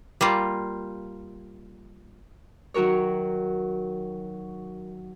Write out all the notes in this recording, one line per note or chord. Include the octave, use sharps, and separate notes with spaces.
G3 A#3 F4
D#3 F#3 F#4 A#4 C#5